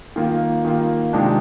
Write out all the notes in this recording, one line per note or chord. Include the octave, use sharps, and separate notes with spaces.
D#3 A#3 F4
D#3 A#3 F4
C3 D#3 G#3 D4 F4